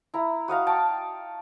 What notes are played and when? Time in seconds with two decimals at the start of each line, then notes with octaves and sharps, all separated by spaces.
0.14 E4 A#5
0.48 F#4 D#5 F5 A#5
0.67 G5 A5 C#6